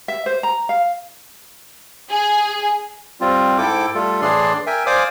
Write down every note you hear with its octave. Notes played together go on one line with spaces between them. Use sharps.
E5
C5
A#5
F5
G#4
G3 C4 F4
G#2 E4 A4 G5 D6
G3 A3 F4 A4
A2 E3 D4 G#4 D5 C6
A#4 E5 G5 G#5
C5 D5 F5 G#5 D6 D#6